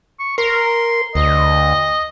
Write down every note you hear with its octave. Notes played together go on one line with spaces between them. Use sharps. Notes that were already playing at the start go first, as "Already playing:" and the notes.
C#6
A#4 C6
D2 D#5